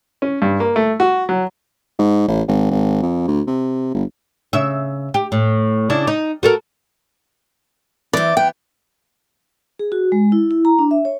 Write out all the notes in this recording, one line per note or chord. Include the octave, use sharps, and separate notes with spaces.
C#4
G2
A#3
A3
F#4
F#3
G#2
A1
G#1
G#1
F2
D2
C3
G1
C#3 E5
G4
A2
C#3 D4 E4
D#4
F#4 A4 A#4
E3 C4 D5
B3 G5
G#4
F#4
G#3
E4
E4
A#5
D4
E5
C#5